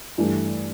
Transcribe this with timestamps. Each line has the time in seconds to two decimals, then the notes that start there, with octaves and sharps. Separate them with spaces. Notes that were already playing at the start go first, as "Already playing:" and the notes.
0.18 G2 E3 A3